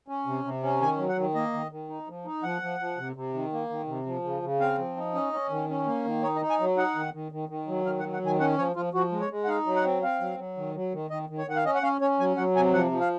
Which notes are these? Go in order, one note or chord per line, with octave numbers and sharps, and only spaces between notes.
C#4
C3
C3
C#4
D#3 G#5
F#3
F#5
D#3
A#3 D#5
D#3
D#3
D#4
F3
D#4
F3 F#5
F3
F3
C3
C3
D#3
A#3
D#3
C3
F3
C#3
C#3
C4 F5
F3
D#4
C#4 D#5
C#4
D#3
C#4
A#3
D#3
D#4 C#5
D#5
D#4
G#5
F#3
D#4 F#5
D#3
D#3
D#3
D#3
F#3
D#3 F5
F#5
F#3
F#5
D#3 G#5
C#4 F#5
F3 C#5
F3 F4
F3 F#4
G#3
C#5
G#3
F#5
D#4 F5
F#3
F#5
C4
C4 F5
F#3
F#3
D#3
F#3
D#3
D#3 D#5
D#3
C#5
D#3 F#5
F5
C#4 D#5
F#5
C#4 F5
C#4 C#5
F#3 G#5
F#3 F#5
C3 G#5
F3 F#5
F3
F5